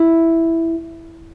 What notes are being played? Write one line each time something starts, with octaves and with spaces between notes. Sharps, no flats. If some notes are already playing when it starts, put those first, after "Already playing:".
Already playing: E4